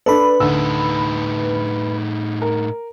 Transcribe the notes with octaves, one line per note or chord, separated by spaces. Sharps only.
D4 A4 B4 B5
D2 A2 D#4 E6
A#4